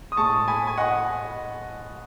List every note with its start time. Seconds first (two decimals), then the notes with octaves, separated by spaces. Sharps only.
0.12 D#6
0.17 A2 G#3 A5 C#6
0.48 G#5 B5
0.67 G#5
0.78 D#5 F#5